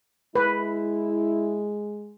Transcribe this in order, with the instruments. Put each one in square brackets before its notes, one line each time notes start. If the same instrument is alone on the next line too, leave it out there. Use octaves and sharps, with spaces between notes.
[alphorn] G#3 [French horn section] E4 [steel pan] B4